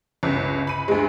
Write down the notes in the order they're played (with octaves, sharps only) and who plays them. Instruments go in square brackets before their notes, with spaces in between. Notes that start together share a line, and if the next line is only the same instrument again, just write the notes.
[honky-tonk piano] G1 C#2
B5 D#7
D2 G2 G#3